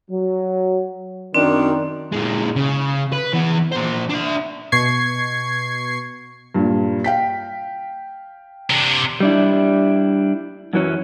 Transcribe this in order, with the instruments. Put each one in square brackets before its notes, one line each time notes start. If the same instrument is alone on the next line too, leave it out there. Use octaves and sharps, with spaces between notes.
[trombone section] F#3
[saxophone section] F#2 D4 [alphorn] D#3 [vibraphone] C4
[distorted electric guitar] A#2 G#3
C#3
B4
E3 B3
A#2 C5
D4 E5
[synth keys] B2 C#6 G#6 C7
[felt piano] G2 A#2
F5 G5 B6
[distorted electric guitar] C3 D4
[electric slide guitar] G3 D4 E4
F#2 E3 F#3 C#4